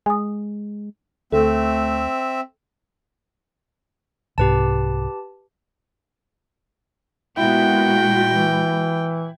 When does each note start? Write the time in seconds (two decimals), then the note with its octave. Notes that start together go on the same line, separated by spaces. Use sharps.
0.06 G#3 G#5 D#6
1.32 D2 A3 C4 A4 E5
4.38 C2 G#2 C3 G4 B4 A5
7.37 A#2 G#3 B3 E4 F#4 G5
8.27 E3